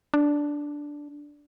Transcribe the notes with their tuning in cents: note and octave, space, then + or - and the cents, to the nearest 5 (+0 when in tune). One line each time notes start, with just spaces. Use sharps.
D4 -5